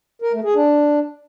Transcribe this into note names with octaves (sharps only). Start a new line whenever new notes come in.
A#4
A3
G#4
D4